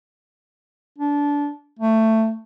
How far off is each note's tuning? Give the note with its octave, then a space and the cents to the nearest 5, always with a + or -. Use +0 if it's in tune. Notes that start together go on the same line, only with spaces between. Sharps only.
D4 -20
A3 +15